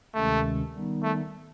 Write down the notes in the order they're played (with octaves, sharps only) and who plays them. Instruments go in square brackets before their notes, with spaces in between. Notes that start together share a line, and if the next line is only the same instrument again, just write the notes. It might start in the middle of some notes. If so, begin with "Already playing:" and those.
[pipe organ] D2 C3 D#3 G#3 C#4 [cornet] A3
[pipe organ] D#3 G3 B3 D#4
[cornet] A3